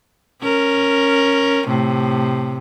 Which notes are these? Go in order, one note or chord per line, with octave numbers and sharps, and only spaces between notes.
C#4 A#4
A2 C3